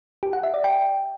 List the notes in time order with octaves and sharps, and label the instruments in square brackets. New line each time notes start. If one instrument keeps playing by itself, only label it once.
[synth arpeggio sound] G4
F#5
E5
D5
G5